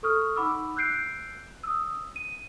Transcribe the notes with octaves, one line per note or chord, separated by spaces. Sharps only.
A4 C#6 D#6 F6
D#4 F#5 B5 D6 E6
E6 F#6 G6 C7 D7
D#6 E6
D#7